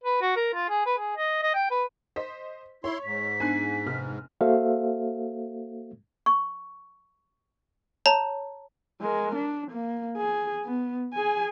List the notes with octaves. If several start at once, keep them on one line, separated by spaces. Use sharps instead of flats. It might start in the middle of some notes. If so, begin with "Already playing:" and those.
B4
F#4
A#4
F4
G#4
B4
G#4
D#5
D#5
G5
B4
C5 D#5 B6
E4 C#5 C6
G#2 B6
B3 D4 D#4 G#5 F#6 C7
F1 F6
A#3 F#4 A4 C5 E5 F5
C#6
C#5 A5 A#5
G#3 A#4
D4
A#3
G#4
B3
G#4 G#5